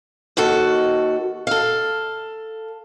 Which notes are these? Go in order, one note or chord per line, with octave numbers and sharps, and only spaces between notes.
D#2 D#3 F#4 A4
A4 F5